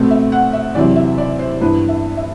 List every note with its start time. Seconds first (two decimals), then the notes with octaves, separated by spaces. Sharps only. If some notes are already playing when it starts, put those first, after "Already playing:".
Already playing: B2 A3 C4
0.11 E5
0.32 F#5
0.53 E5
0.75 E2 C3 F#3 C4 D5
0.96 E5
1.18 D5
1.39 C5
1.61 G2 E3 B3 B4
1.89 E5
2.17 E5